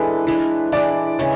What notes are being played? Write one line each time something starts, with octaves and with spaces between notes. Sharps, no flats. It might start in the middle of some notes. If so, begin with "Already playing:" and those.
Already playing: E3 G#3 D4 A4 B4
E3 G#3 D4
E3 G#3 D4 D5
C#3 E3 G#3 C#5